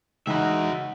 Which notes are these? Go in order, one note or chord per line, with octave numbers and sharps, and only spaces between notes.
C#2 E3 D#4 F#4 E5 B5